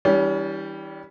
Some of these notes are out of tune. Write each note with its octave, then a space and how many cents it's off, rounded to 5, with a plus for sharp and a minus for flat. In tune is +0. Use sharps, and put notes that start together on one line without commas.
E3 -30 G3 +0 C#4 +35